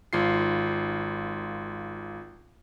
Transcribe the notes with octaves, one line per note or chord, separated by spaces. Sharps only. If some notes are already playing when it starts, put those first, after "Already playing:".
G#1 F4 C7